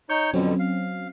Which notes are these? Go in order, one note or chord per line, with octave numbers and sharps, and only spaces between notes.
D#4 C#5 C#6 G6
F2 B2 D3 F#3 C4 C#4
F5